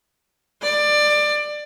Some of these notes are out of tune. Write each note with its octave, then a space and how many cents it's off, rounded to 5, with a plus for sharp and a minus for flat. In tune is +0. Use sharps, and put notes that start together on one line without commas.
D5 +20